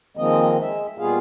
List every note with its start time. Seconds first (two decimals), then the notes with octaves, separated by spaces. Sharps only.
0.17 D#3 F3 G#3 A#3 C4 D#5
0.61 G#3 E5
0.99 A#2 G3 B3 F4 G#4 F5